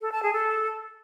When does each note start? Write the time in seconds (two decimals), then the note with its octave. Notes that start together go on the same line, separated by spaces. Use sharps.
0.01 A4
0.12 A5
0.23 G#4
0.33 A4